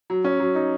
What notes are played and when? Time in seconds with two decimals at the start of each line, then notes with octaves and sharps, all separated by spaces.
0.10 F#3
0.24 C#4
0.40 F#3
0.55 D#4